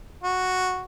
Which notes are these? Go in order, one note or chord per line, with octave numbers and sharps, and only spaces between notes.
F#4